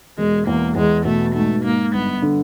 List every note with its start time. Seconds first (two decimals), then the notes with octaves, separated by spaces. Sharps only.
0.18 E1 G#3
0.47 E2 A#3
0.76 E2 G#3
1.05 B2 A3
1.34 G#2 A3
1.64 G#2 A#3
1.94 G1 B3
2.22 D3